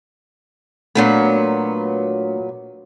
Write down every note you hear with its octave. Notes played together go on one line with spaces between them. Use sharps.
A#2 F#3 A3 B3 D4 A#4